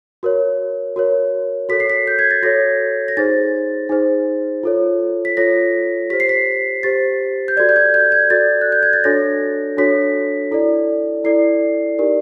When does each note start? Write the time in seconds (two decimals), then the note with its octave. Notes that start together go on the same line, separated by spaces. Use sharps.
0.23 F#4 A#4 C#5
0.96 F#4 A#4 C#5
1.69 F#4 A4 C#5 B6
1.80 C7
1.90 B6
2.07 G6
2.19 G#6
2.31 A6
2.43 F#4 A4 C#5 A#6
3.08 A#6
3.17 D#4 G#4 C5 A6
3.89 D#4 G#4 C5
4.63 F4 A4 C#5
5.25 B6
5.37 F4 A4 C#5 A#6
6.10 G4 C5 B6
6.20 C7
6.29 B6
6.83 G4 C5 A6
7.48 G6
7.57 F#4 A4 D5 G#6
7.69 G6
7.76 G#6
7.94 G6
8.12 G#6
8.30 F#4 A4 D5 A6
8.61 F#6
8.72 G6
8.83 G#6
8.93 A6
9.04 D4 F#4 A4 C#5 A#6
9.77 D4 F#4 A4 C#5 B6
10.51 E4 A4 D5
11.24 E4 A4 D5 C7
11.98 D#4 G4 A#4 D5